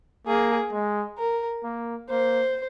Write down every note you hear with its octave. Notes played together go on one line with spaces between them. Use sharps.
A#3 G#4
G#3
A#4
A#3
A#3 C5